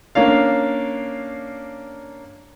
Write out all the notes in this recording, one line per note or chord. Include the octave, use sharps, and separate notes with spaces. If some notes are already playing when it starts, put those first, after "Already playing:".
A#3 C#4 D4 F5